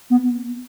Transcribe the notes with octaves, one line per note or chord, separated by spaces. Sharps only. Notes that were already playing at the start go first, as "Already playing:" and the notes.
B3